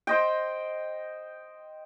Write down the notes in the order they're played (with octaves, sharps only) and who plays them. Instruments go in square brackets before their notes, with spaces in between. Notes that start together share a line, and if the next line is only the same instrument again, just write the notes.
[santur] C5 D#5 G5